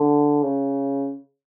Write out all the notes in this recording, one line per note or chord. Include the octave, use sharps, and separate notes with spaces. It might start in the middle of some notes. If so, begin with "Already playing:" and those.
Already playing: D3
C#3